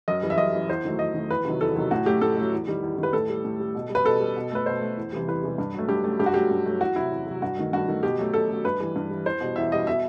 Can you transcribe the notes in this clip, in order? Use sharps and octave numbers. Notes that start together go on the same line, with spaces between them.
F#2 D#5
E3 G3
E5
F#2 D#5
E3 G3
E2 C5
D#3 F#3 A3
E2 D#5
D#3 F#3 A3
E2 B4
C3 D#3 F#3
E2 A4
C3 D#3 F#3
A2 F#4
F#3 A3 G4
A2 A4
F#3 A3
E2
D#3 G3
E2
D#3
G3 B4
A2 A4
G3
A2
G3
B2
G3
B4
B2 A4
G3
B2
A3 B4
B2 C5
A3
E2
C3 E3 G3
E2 B4
C3 E3 G3
G2
F#3 A3
G2 G4
F#3 A3
G2 G4
F#4
F#3 A3 G4
G2
F#3 A3
E2 F#4
C3 F#3 E4
E2
C3 F#3
G2 F#4
D#3 A3
G2 F#4
D#3 A3
B2 G4
F#3 A3
B2 A4
F#3 A3
G2 B4
E3 G3
G2
E3 G3
E2 C5
B2 G3
E2 E5
B2 G3 D#5
B2 E5